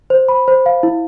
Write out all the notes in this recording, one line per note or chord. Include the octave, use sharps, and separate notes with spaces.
C5
B5
C5
F5
E4